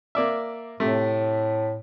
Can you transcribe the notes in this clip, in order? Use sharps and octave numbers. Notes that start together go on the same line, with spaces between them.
A#3 D5 E5
A2 C3 A3